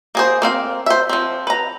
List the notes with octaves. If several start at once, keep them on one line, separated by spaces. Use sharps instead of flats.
A#3 G#4 C5
A#3 C4 F5
C5 E5
F3 C4
B4 A#5